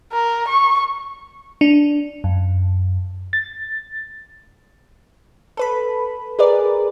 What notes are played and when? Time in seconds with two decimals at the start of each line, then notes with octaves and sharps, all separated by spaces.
0.12 A#4
0.49 C#6
1.61 D4
2.24 F#2
3.33 A6
5.57 A4 B4 B5
6.39 G#4 A#4 B4 D5